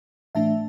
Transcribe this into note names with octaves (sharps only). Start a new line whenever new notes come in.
A2 E3 A3 D4 E5 A5